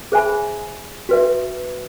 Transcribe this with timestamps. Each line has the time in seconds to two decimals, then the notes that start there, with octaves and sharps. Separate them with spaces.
0.12 G#4 C5 E5 G#5 B5
1.09 F#4 B4 E5